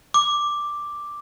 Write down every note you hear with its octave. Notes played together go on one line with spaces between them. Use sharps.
D6